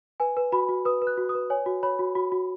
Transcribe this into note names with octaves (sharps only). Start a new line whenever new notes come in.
B4 G#5
B4
F#4 B5
F#4
B4 D#6
B4
F#6
F#4
D#6
B4
C#5 G#5
F#4
C#5 B5
F#4
F#4 B5
F#4